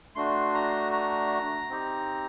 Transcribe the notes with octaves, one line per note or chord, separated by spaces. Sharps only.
A3 D4 F#4 C6
A#5
A#5
C4 D#4 G4